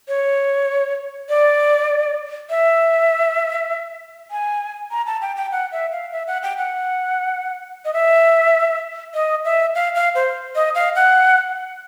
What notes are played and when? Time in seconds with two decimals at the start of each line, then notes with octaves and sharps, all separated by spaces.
0.08 C#5
1.29 D5
2.50 E5
4.31 G#5
4.91 A#5
5.06 A5
5.22 G5
5.36 G5
5.52 F#5
5.72 E5
5.92 F5
6.12 E5
6.27 F#5
6.43 G5
6.58 F#5
7.85 D#5
7.94 E5
9.14 D#5
9.45 E5
9.75 F5
9.95 F5
10.15 C5
10.55 D#5
10.75 F5
10.95 F#5